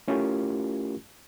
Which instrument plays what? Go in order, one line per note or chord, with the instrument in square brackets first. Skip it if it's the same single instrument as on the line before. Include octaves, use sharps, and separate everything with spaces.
[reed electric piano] A3 C#4 E4 F4 G4 A#4